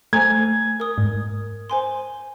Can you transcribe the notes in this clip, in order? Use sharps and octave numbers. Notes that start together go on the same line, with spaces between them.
A3 C5 G#5 A#5 G#6
A#4 D#6
G#2
C5 G#5 C6